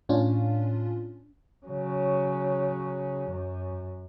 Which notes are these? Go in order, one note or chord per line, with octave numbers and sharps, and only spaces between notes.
A2 C#4 D4 F4
C#3 F#3
F#2